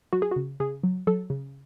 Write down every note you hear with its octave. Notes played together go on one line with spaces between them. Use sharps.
F#3 F#4
G#4
F#4
C#3
C#3 G#4
F#3
F#3 A4
C#3